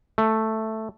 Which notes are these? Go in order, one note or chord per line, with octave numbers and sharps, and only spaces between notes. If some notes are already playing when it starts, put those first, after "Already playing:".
A3